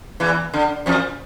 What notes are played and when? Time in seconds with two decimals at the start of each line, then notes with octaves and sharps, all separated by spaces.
0.20 E2 E3
0.54 D3
0.86 F2 F3